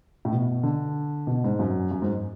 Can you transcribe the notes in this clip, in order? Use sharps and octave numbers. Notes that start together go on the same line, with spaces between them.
A2
B2
D3
B2
G#2
F#2
F#2
G#2